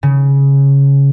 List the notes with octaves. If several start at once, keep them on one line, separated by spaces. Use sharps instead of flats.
C#3